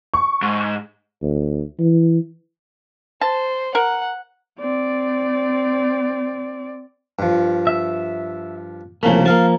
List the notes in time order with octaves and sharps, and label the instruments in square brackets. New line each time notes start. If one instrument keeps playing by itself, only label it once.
[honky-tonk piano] C#6
[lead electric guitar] G#2
[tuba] D2
E3
[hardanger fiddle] C5 [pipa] A5
[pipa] A#4 [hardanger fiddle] F#5
[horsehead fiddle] C4 D5
[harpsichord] G2 F3
[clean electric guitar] E5
[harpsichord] C2 C#3 A3 [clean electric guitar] F3 A#3
[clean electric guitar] F3 A#3 [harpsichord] F5 A5